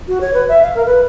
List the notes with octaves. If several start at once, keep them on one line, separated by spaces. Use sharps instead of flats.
F#4
C#5
B4
E5
F5
A#4
B4